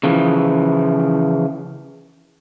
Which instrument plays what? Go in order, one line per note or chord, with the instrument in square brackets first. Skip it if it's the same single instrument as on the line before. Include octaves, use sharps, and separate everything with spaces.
[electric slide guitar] C#3 E3 F3